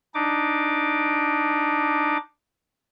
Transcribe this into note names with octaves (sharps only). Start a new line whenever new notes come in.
D4 D#4 D6